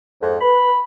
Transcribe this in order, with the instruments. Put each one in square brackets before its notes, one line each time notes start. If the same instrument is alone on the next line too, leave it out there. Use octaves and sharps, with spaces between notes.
[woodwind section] F2 G#2
[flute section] B4 [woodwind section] B5